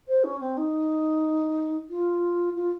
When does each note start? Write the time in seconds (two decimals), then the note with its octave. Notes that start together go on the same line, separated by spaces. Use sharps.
0.08 C5
0.24 C#4
0.40 C4
0.57 D#4
1.90 F4
2.56 F4